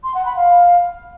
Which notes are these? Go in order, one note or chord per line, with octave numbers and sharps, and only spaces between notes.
C6
F#5
B5
F5